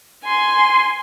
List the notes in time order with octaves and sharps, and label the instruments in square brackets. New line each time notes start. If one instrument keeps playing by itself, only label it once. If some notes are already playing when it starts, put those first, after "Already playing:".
[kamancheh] G#5 C6